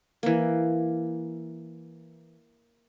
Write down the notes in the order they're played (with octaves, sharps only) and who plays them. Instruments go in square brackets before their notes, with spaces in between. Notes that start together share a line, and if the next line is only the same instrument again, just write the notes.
[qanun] E3 A#3